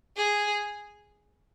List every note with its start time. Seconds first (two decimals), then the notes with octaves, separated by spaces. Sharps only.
0.17 G#4